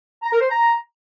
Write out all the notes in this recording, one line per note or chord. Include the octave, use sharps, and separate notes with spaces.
A#5
A#4
C5
A#5